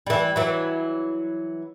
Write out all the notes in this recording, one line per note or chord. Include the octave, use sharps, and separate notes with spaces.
E3 G3
E3 F#3